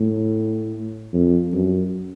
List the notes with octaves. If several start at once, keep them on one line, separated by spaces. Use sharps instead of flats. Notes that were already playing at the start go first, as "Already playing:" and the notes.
Already playing: A2
F2
F#2